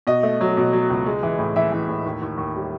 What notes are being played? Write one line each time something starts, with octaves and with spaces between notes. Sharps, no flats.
B2 D#5
A3
F#3
B2
F#3
C#2
G#3
E3
A2
E3 E5
E3
A2
D#2
D#2
D#2
G3